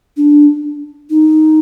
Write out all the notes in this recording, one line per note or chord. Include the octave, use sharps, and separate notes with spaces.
D4
D#4